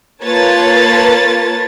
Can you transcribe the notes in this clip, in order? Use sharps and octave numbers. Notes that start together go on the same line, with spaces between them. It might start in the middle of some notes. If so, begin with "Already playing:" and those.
A#3 F4 B4 C#5 A5 A6